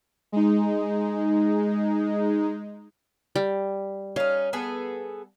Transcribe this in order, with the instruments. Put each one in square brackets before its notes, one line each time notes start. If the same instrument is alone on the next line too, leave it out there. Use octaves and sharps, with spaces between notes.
[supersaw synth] G#3 D#4
[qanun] G3
[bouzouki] C#4 D#4 [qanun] F5
[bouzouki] B3 G#4 A4